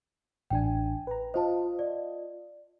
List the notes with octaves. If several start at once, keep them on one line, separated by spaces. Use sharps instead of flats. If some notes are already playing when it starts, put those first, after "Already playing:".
A1 D4 G5 G#5
B4 A#5
F4 C5 D#5 A5
D5